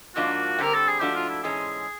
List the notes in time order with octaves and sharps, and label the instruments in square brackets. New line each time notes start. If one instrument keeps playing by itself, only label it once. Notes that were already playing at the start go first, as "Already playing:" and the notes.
[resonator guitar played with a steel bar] G#2 F3 A#3 D4 F4 [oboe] F#4
[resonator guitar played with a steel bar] D3 G3 C4 [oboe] A#4
[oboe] A4
G#4
[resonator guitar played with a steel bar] G#2 F3 A3 D4 F#4 [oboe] G4
[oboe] F4
E4
[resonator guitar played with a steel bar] G#2 E3 G#3 C#4 [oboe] G#4